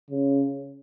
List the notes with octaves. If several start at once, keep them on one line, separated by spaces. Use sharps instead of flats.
C#3